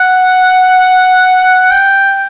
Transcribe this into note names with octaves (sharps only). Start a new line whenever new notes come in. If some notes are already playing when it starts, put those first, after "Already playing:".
Already playing: F#5
G5